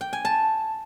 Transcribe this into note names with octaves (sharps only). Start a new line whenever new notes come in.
G5
G#5
A5